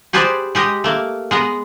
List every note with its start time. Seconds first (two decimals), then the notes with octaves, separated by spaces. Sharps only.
0.13 G4 G#4 B4 C5 D5
0.55 G#3 G4 D#5
0.84 A3 A#3
1.31 G#3 B3 A#5